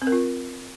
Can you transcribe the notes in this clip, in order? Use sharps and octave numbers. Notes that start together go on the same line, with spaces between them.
C4
A#4
F4